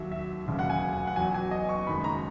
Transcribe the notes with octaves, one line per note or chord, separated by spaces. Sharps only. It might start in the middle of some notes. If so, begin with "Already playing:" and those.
Already playing: D#2 D#3 F#3 E5
E5
E1 D#2 C#3 F#3
F#5
G#5
F#5
F#5
E2 B2 F#3 G#5
G#5
D#5
C#6
F#1 F#2 D#3 G#3 B5
A#5